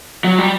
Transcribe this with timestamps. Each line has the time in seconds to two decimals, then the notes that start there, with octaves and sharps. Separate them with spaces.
0.24 F#3
0.39 G3